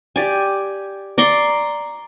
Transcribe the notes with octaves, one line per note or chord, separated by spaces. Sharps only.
G4 D5 G#5
D5 A#5 C6 C#6